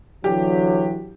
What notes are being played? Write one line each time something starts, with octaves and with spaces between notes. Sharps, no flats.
D3 E3 F#3 G4